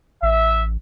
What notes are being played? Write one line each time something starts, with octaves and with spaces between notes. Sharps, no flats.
A1 E5